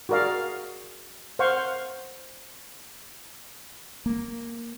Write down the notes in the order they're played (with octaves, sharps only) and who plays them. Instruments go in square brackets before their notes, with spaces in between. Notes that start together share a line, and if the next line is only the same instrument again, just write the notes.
[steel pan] F#4 G#4 A#4 D5 F5
C5 F5 F#5 C6 C#6
[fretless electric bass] A#3